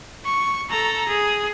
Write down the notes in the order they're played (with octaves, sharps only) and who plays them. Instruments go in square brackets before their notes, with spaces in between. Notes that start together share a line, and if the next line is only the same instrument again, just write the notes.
[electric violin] C#6
A4 A#5
G#4